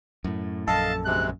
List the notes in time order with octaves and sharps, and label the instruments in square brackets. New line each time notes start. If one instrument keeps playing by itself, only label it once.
[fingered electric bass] F#2 A2
[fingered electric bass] A#1 F#2 [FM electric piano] A4 [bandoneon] D#5 F5 [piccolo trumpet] A5
[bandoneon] D2 C3 G#3 [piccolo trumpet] F#6